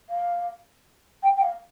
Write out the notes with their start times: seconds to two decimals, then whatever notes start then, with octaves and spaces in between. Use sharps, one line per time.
0.10 F5
1.23 G5
1.36 G5
1.42 F5